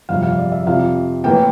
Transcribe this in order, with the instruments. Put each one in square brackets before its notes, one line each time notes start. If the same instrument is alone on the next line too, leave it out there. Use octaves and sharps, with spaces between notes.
[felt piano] G1 F2 C3 F5
F5
D5
E5
F2 C3 F3 F5
A2 E3 A#3 G5